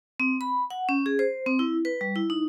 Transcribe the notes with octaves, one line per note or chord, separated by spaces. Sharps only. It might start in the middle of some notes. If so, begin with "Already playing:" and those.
C4
B5
F#5
C#4
G#4
C5
C4
E4
B4
G3
E4
D#4